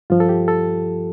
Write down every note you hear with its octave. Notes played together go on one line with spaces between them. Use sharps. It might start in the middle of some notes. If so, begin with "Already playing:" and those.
G2 F3 F4
A4
G4
A4